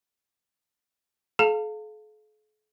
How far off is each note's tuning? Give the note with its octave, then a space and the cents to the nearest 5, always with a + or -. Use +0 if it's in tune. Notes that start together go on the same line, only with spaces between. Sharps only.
A4 -45 F5 +0 A5 +40